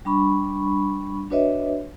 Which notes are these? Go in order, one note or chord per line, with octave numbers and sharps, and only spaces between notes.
G3 D4 B5 C#6
D4 F#4 B4 C#5 D#5 E5